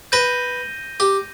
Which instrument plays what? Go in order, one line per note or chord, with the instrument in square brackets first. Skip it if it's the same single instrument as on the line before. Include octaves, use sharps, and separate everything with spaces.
[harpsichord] B4 [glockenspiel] G6 A#6 D#7 G7
[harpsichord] G4